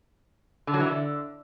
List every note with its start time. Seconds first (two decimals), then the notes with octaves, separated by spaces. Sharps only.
0.67 D3
0.74 F#3
0.80 E3
0.86 D3